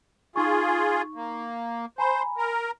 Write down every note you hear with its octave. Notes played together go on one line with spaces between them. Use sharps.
D#4 F4 G#4 C#6
A#3
C5 G#5 A#5 B5
A#4